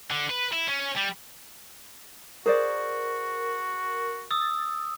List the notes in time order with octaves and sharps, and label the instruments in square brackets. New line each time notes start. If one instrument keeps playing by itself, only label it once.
[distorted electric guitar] D3
B4
E4
C#4
G3
[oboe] F#4 [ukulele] G#4 C5 D5 [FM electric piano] A#4
[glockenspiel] D#6 E6 [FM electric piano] A6